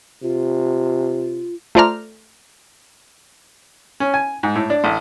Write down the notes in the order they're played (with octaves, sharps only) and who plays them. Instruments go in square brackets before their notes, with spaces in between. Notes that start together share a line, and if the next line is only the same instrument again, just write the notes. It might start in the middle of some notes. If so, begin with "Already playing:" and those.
[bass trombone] C3 [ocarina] F4
[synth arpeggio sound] A3 F4 C5 D5 A#5 F6
[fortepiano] C#4
G#5
G#2
A2
D4
A1